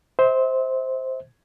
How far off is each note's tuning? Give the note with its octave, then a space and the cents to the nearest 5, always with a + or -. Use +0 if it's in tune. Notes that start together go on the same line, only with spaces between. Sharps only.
C5 +0 E5 -40